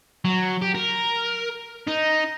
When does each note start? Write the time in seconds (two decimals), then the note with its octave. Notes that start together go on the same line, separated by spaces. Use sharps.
0.25 F#3
0.62 G4
0.75 A#4
1.87 D#4